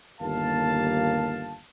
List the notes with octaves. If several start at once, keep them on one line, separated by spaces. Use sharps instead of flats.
G1 D#2 A#3 F5 A5